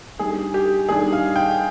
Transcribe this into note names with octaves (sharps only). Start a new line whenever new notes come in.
D#3 G3 D4 G#4
G4
D#3 G3 D4 G#4
F5
G5